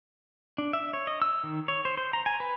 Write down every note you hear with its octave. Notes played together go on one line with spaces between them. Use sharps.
D4
E5
C#5
D#5
E6
D#3
C#5
C5
C5
A#5
G#5
B4